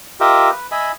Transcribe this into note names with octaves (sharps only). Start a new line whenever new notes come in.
F4 G4 A#4 D#5 E5
B4
D#5 E5 G#5 B5